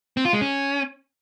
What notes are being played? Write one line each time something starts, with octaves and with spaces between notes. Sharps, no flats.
C4
F4
G#3
C#4